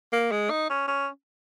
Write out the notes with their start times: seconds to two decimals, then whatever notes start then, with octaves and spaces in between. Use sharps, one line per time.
0.13 A#3
0.31 G#3
0.50 D#4
0.70 C#4
0.88 C#4